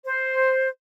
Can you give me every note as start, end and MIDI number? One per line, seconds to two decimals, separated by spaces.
0.04 0.67 72